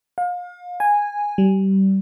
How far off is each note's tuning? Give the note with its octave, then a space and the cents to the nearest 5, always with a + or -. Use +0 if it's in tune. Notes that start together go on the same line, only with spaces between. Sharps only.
F5 +35
G#5 -10
G3 -25